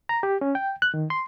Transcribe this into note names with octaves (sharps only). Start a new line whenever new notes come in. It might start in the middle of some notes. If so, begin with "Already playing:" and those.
A#5
G4
C#4
G5
F#6
D#3
C6